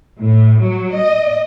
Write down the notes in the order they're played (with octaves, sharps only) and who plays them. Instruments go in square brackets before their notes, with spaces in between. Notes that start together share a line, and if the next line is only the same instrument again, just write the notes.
[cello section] A2
F#3
D#5